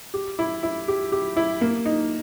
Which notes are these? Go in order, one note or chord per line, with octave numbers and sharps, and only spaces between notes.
G4
E4
E4
G4
G4
E4
A#3
D#4